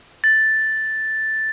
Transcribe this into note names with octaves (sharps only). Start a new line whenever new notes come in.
A6